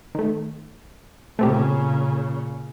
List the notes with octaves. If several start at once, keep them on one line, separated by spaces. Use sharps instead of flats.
D#3 A3
A#2 C#3 A3 C4 G4